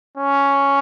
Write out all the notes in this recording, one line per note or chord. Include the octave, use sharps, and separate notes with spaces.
C#4